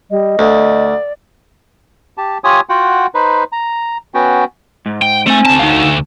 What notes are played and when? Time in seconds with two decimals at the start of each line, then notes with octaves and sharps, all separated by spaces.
0.11 G3 D#5
0.39 D2 D5
2.18 G4 A5
2.44 F4 G4 C#5 G#5 D#6
2.69 F4 F#4 F#5 G5
3.15 D#4 B4 C5
3.52 A#5
4.14 B3 C#4 F#4 G5
4.86 G#2
5.02 G5
5.26 A3 C4 G#5
5.45 D2 A5
5.59 D#4 F5